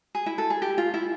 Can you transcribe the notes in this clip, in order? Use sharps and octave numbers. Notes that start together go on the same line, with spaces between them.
G#4
E4
A4
G#4
G4
F4
E4